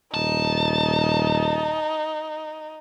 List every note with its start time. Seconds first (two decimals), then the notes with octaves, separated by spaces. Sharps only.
0.14 D#1 D#4 A5